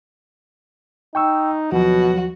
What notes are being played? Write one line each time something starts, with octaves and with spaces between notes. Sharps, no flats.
D#4 G5 C#6 E6
D#2 B2 F3 F#3 F#4